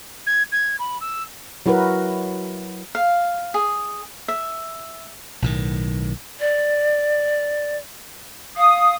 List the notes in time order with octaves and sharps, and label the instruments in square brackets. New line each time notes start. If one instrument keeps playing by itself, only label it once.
[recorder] G#6
G#6
B5
E6
[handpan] F#3 E4 F#4 A#4 B4
[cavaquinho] F5
G#4
E5
[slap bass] B1 A2 D#3
[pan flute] D5
[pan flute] F5 [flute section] D#6